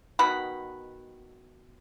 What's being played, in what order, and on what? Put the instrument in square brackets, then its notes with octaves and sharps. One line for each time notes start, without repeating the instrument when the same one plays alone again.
[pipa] B2 D#3 F#5 B5